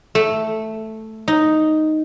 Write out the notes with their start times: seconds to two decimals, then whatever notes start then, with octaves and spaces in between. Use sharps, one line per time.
0.15 A3
1.28 D#4